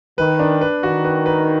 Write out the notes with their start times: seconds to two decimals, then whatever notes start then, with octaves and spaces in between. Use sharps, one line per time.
0.18 D#3 B4
0.39 D4
0.61 B4
0.83 D#3 F#4
1.05 B4
1.26 B4